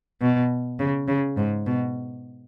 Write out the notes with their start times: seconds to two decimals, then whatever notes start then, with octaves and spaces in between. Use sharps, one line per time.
0.21 B2
0.79 C#3
1.08 C#3
1.37 G#2
1.66 B2